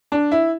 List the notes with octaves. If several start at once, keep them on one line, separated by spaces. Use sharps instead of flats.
D4
E4